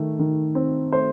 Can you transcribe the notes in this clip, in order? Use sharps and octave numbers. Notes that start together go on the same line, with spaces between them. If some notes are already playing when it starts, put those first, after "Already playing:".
Already playing: D#3 A3
D#3
C4
A3 C5